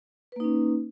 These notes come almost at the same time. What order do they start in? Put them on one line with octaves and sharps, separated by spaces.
B4 A#3 D#4 C#4